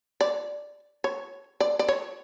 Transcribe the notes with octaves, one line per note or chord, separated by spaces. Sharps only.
D5
C#5
D5
D5
C#5